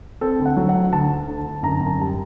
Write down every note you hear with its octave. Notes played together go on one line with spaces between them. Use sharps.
C4 A4
D2
F#5
F#3
F#5
D2
D2 A5
D2
D3
D2
F#2 A#5
F#2
A5
G3 A5